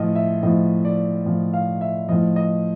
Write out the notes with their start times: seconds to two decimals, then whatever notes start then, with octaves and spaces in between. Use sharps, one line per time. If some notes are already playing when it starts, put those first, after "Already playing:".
Already playing: A2 F3 D#5
0.15 E5
0.43 A2 F3 D#5
0.85 D5
1.26 A2 F3
1.53 F5
1.81 E5
2.09 A2 F3 D#5
2.36 D#5